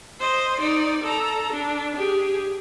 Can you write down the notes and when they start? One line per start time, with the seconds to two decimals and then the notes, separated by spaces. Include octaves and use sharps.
0.20 C5 D#5
0.59 D#4 D5
1.04 A4 A#5
1.52 D4
1.96 G4 G#4